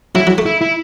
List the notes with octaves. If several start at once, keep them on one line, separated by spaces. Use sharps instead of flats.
F#3 E4
F#3
A3
E4
E4